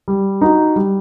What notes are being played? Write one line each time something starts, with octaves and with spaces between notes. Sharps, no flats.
G3
D#4 F#4
G3